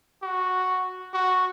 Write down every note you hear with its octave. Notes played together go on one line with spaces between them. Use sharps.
F#4
F#4